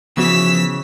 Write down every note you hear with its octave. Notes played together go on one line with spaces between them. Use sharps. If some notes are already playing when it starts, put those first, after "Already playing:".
C#3 E3 F3 B3 F#4 E6 B6